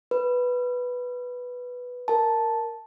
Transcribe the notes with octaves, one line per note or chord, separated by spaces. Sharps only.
B4
A#4 A5